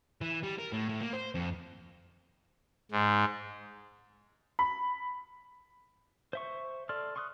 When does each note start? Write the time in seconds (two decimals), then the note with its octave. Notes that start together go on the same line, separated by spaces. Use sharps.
0.21 E3
0.43 G3
0.59 A#4
0.73 A2
0.89 A2
1.01 A#3
1.13 C5
1.35 F2
2.92 G#2
4.59 B5
6.33 C5 E5 C#6
6.89 A4 D5 C6 F6
7.16 C6 C#6 D#6 F6 F#6